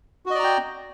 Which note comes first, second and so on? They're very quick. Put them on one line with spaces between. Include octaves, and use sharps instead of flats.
F#4 D#5 D5 A#5 G5